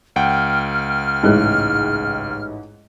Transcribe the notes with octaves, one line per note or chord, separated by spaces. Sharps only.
C#2 F#5 G5 F6
A1 G#2 G#3 E4 F#6